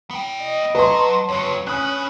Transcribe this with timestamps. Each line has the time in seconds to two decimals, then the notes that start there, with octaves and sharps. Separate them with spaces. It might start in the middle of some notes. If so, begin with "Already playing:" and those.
0.11 B3 G5
0.41 D#5
0.75 F#3 B4 A5 C6
1.29 F2 F#3 C#5
1.67 C#4 D4 B4 D#6 F#6